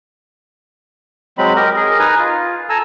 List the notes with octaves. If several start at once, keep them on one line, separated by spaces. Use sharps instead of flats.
F#3 G#3 C4 B5
G4 A#4 D#5
G#4 A#4 D#5
D#4 B4 G#5 A#5
F4
A4 G#5 A#5 E6